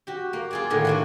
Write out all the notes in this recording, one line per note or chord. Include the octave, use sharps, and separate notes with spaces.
F#4 G4
A#3
F4 G#4 D5
A2 D3 D#3 A#3
E3 D4 F#4